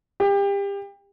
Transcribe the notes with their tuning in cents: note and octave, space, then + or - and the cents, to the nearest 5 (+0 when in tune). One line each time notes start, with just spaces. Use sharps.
G4 +30